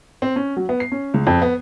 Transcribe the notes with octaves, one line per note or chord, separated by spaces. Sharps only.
C4
C#4
F#3
B3
C7
C#4
C#2
F2
B3